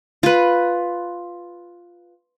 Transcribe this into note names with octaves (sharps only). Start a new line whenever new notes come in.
F4 B4